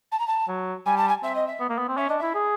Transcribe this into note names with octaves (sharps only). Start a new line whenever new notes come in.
A5
A#5
A5
F#3
G3 G#5
A5
G#5
C4 E5
D#5
E5
B3
A#3
B3
C4
C#4 E5
D4 D#5
E4 E5
G#4